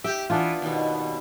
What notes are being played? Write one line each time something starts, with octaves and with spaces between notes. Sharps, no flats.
G4 E5
E3 B3 D4 F4
D#2 B2